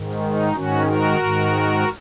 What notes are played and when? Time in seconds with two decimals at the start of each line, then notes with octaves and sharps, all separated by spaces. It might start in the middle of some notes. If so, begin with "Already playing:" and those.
Already playing: G#2 D#3
0.22 D#4
0.54 G#2 D#3 C#4 F#4
0.86 F#4 A#4
1.19 G#2 D#3